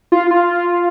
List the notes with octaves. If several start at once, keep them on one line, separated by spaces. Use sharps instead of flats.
F4
F4